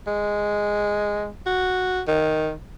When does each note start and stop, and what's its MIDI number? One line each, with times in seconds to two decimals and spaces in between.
0.07 1.29 56
1.46 2.02 66
2.08 2.53 51